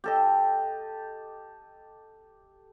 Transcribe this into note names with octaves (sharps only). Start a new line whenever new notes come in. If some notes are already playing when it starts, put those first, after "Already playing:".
G4 A4 D#5